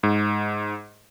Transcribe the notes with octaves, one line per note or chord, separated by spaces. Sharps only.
G#2